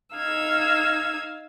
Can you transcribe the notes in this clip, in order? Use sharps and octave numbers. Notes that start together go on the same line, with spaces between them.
D#4 F5 E6 G#6